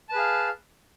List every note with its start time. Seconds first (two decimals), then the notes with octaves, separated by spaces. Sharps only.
0.09 A5
0.12 B4
0.15 G#4
0.18 F5